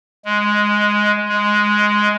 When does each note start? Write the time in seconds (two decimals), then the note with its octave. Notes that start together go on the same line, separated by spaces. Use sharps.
0.25 G#3
1.28 G#3